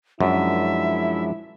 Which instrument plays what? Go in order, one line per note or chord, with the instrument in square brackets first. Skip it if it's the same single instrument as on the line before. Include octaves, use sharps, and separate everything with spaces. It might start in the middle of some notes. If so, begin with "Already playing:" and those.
[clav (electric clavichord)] F#2 [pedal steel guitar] F3 G#3 D4 [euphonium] E4 [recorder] E5